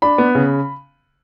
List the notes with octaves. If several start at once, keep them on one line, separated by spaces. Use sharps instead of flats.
D4 B5
B3
C#3